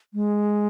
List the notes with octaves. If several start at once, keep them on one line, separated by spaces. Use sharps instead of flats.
G#3